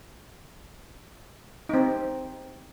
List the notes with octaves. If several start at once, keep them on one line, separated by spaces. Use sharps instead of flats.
C4 D#4